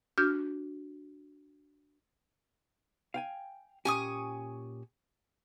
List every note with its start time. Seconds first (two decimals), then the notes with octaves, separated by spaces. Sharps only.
0.18 D4 F#4 F6 G6
3.14 F5 G5 G#5
3.85 A#2 C#4 G4 G#5 C#6 D#6